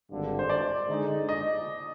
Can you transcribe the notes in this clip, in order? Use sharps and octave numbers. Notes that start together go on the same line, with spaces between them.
G#1 G2 D3
C5
D5
D3 G#3 D#4
D#5